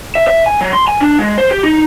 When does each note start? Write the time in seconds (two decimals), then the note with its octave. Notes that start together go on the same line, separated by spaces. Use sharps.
0.15 E5
0.28 E5
0.46 G#5
0.61 F#3
0.73 C6
0.88 G#5
1.00 D4
1.19 G#3
1.38 C5
1.51 G4
1.63 D#4